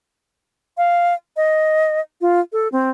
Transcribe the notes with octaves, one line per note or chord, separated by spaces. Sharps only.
F5
D#5
F4
A4
C4